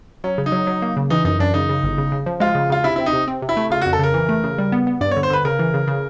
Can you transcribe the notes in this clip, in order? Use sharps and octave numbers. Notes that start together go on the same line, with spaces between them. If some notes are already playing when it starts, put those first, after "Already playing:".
F#3 C#4
C#3
D#4
F#3
F#3
A#3
C#3
E3 D#4
F#2 D#4
F#2 D4
C#3 D#4
C#3
G1
C#3
C#3
F3
G#3 F4
C#3
C#3 F4
C3 E4
C4 E4
D#4
C3
C4
C3
E4
A3
C#3 F4
F#4
F2
A4
C#3 A#4
E3
A3
C#3
G3
B3
B3
G2 D5
C#5
D3
C5
D3 B4
C#3 A#4
E3
C#3
C#3